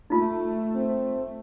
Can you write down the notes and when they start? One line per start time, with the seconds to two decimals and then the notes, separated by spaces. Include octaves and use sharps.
0.10 A3 D#4 F4
0.75 C4